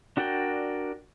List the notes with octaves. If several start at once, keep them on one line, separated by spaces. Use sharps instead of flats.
D4 F#4 A#4 D5 G5